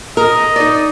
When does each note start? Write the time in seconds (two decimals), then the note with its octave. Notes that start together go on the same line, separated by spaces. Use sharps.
0.17 A#4 D#5
0.56 D#4 D5